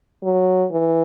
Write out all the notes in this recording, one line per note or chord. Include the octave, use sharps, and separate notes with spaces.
F#3
E3